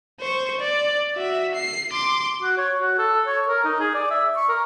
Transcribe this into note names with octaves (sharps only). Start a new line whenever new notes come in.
C5 C#6
D5
F#4 E5
C7
C6 D6
F#4
C#5
F#4
A4
C#5
A#4
D#4
G#4
D5
E5
C#6
A#4